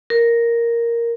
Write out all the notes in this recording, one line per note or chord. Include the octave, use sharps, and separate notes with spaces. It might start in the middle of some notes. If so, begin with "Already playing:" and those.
A#4